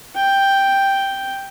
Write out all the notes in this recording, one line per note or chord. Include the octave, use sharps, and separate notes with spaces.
G5